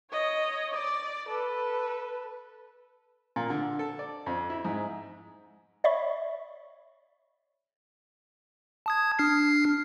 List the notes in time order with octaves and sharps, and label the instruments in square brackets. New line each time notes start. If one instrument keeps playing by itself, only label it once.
[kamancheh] C#5 D#5
D5
A4 B4
[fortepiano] A#2
D3
A4
D5
F2
E4
G#2
[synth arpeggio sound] C#5 D5 E5 B5 C#6
[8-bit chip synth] A5 D#6 G#6
D4 F6 C7